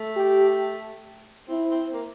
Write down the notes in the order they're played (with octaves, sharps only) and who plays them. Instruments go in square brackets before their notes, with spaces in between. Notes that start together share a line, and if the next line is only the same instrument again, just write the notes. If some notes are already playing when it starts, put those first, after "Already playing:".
Already playing: [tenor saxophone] A3
[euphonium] G4
[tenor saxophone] C4 [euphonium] E4
[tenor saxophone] C4
A#3